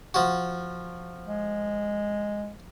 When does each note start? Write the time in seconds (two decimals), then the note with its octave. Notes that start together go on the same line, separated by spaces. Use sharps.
0.14 F3 F#4
1.27 G#3